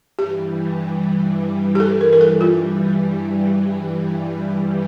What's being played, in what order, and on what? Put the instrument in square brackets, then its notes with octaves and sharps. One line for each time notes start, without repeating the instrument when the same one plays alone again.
[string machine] G2 E3 G3 [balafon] G4
[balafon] G4
A4
A#4
A#4
A4
F4